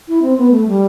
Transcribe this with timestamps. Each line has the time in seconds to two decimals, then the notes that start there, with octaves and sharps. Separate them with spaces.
0.08 E4
0.22 C4
0.37 B3
0.51 A3
0.67 G3